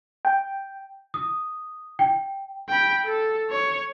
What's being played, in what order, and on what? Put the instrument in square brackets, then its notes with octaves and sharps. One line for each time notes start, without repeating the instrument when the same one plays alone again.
[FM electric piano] G5
[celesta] D#6
G5
[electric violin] G5 B5
A4
C#5